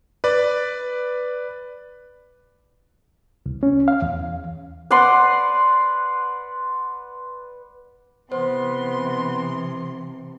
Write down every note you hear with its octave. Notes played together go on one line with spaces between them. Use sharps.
B4 D5
C2
C#4
F5
E2
B4 D5 F#5 C6
C3 E3 B3 C5 C6